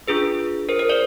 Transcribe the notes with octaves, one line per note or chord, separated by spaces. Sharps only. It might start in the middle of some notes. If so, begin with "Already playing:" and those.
D4 F4 G#4 B4
A#4 C5
A#4 C5
C5 D5